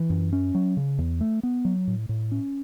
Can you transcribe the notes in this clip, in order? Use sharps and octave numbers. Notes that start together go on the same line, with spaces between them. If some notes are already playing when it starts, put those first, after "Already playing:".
Already playing: E3
F#2
C#4
F#3
C#3
E2
A3
B3
F#3
A2
A2
C#4